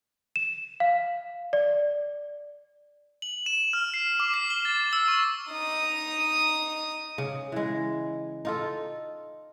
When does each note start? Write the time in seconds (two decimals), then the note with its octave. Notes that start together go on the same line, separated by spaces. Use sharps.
0.36 E7
0.80 F5
1.53 D5
3.22 F#7
3.46 E7
3.73 F6
3.94 C7
4.20 D6
4.34 C7
4.50 G7
4.65 A6
4.93 E6
5.08 C#6
5.52 D#4 D#6
7.18 C#3
7.52 E3 G#3
8.45 D#4 F4 A4